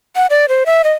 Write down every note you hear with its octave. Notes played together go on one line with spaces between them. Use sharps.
F#5
D5
C5
E5
D#5